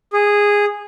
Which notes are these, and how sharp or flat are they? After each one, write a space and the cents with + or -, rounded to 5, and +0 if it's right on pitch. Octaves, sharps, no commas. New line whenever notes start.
G#4 -10